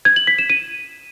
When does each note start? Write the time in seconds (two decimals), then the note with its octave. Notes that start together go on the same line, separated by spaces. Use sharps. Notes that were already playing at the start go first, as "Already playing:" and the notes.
0.05 G#6
0.16 F#7
0.27 B6
0.38 E7
0.50 D#7